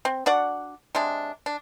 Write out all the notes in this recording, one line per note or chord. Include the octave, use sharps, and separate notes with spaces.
C4
D4 F#4 D5 F#5
C3 G#3 D4
D4